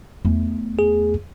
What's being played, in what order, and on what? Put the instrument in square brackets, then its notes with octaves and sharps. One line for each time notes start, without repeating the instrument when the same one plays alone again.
[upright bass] E2 A3
[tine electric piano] G#4